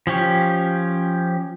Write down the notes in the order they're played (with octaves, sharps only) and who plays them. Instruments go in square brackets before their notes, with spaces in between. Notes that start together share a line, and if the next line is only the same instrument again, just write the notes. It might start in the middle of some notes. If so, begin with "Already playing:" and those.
[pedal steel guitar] F3 C#4 G4 C#6